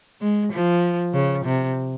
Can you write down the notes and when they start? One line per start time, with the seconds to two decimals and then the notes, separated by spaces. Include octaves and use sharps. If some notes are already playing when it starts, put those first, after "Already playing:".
0.21 G#3
0.52 F3
1.13 C#3
1.45 C3